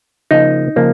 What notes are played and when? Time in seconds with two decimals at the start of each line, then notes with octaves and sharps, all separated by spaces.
0.31 C#3 F3 A#3 D#4
0.76 C#3 F3 A#3